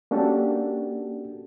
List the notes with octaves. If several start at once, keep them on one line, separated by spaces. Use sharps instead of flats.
A#3 C#4 D4 F#4 G4 A4